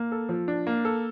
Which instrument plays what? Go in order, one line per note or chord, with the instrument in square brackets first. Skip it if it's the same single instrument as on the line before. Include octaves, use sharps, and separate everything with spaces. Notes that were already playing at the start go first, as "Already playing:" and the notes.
Already playing: [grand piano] A#3
A4
F3
D4
A#3
A4